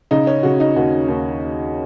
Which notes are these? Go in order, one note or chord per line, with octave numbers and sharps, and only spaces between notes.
C#3 D#4
C#4
C#3 F#4
D#4
D#2 F#4
D#2